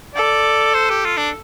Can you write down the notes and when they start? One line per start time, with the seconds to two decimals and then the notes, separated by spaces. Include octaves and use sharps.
0.15 A4 D5
0.74 C5
0.90 G4
1.05 F4
1.17 D4